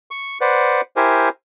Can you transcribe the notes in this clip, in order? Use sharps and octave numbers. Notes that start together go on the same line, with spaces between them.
C#6
B4 C5 D5 F#5
E4 G4 A#4 C5 G#5